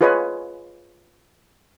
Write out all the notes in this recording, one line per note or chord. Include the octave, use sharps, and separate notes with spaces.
F4 G#4 B4 C#5 D#5 G#5